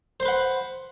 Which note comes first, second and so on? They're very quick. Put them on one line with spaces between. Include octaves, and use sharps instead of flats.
C5 C6 B4 F#5